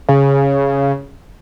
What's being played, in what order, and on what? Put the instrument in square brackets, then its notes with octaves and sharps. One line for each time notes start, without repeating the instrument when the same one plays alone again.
[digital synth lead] C#3